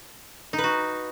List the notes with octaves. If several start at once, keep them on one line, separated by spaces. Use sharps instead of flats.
D#4
B4
F#4